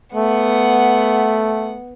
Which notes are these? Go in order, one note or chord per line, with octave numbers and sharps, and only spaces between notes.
A3 B3 F#5